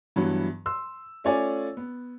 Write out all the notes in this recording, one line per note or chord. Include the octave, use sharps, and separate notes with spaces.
G2 E3 F#3 B3
C6 E6
A3 C#4 F4 C#5 D5 G#5
B3